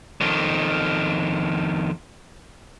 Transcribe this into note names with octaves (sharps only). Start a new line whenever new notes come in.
F2 D#3